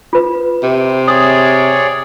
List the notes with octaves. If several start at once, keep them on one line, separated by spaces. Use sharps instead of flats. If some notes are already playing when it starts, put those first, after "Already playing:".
F4 B4
C3
G#4 C#5 D5 D#6